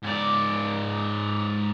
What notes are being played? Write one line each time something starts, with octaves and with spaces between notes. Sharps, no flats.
G#2 D5